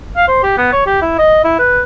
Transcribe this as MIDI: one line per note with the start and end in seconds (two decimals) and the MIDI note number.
0.16 0.27 77
0.28 0.41 72
0.43 0.53 67
0.57 0.71 59
0.72 0.86 73
0.86 0.98 67
1.01 1.14 64
1.18 1.41 75
1.44 1.58 64
1.59 1.82 71